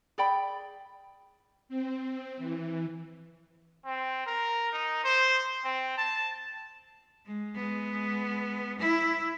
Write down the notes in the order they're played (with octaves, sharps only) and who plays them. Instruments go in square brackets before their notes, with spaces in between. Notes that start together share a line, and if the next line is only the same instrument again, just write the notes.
[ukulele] G#4 D5 G5 B5
[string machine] C4
E3
[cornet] C4
A#4
D#4
C5
C4
A5
[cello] G#3
G#3 B3
E4